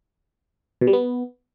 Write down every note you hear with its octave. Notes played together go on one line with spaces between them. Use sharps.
B2
G3
B3